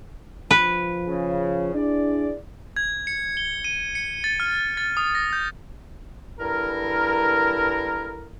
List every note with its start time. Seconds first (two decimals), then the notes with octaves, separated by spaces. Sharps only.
0.51 F3 B4
1.07 C#3
1.74 D4 E4 G#4 D5
2.76 G#6
3.07 C#7
3.37 G7
3.64 D#7
3.95 C#7
4.24 A6
4.40 F6
4.77 A6
4.97 D#6
5.15 A#6
5.33 G6
6.40 G2 E4 A4 A#4